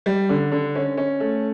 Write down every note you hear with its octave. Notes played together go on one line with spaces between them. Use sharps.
G3
D3
D3
C#4
C#4
A3